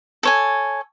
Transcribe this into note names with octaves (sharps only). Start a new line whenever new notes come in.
A4 C#5 G#5